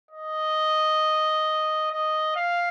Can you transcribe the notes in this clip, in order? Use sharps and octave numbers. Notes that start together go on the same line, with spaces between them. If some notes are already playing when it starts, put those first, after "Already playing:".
D#5
D#5
F5